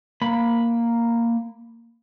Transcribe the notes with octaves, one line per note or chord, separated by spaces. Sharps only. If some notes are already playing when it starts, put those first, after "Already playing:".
A#3 B5